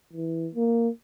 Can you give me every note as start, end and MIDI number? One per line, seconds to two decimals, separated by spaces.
0.13 0.49 52
0.55 0.89 58